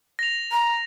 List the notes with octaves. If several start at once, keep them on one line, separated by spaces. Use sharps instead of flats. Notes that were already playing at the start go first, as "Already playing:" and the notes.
A#6 F7
A#5